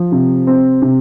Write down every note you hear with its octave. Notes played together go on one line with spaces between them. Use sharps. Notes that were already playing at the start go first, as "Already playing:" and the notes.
Already playing: F3
C3
C4
C3